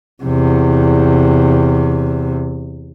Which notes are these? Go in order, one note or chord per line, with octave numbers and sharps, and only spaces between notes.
E2 C3